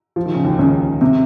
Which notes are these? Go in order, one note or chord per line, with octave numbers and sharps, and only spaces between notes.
F3
D#3
C#3
D#2 D#3
C#2 C#3
C3